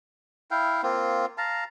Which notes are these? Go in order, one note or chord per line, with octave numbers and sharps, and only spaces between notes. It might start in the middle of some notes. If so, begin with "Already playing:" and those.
E4 F5 G5
A#3 C4 F4
F5 A5 A#5